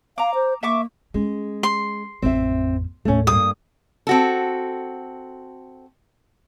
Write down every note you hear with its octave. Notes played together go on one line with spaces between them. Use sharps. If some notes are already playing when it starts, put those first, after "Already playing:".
F5 A#5 D6
C5
A#3 E5 C#6 D6
G#3 C#4
C6
A1 F2 C4 E5
D#2 A2 A3 C#4
G2 A#3 D#6
C4 F#4 A4